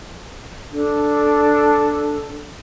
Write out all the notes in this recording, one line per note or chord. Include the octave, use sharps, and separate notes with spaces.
D4 A4